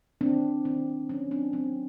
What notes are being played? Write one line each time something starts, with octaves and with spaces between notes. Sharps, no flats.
D#3 C4 D4
D#3 C4
F#3 C#4
C4 D4
F#3 C4